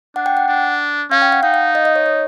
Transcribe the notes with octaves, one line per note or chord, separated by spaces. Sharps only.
D4 F#5
G5
F#5
D4
C#4 F5
G5
F#5
D#4 F5
F5
D#5
D#5
C#5
C#5